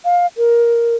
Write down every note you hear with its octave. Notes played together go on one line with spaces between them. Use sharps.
F5
A#4